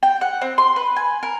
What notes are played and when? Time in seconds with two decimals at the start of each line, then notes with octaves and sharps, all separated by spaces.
0.03 G5
0.21 F#5
0.41 C4
0.58 C6
0.76 B4
0.96 G#5
1.23 A#4